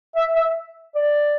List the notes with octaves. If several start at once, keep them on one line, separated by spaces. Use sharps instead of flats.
E5
E5
D5